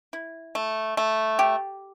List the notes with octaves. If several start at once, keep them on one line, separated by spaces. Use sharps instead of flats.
E4
A3
A3
G4